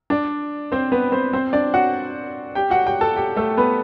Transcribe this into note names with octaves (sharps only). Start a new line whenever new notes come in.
D4 D5
C4 C5
B3 B4
C4 C5
C4 C5
D4 D5
F#4 F#5
G4 G5
F#4 F#5
G4 G5
A4 A5
G4 G5
A3 A4
B3 B4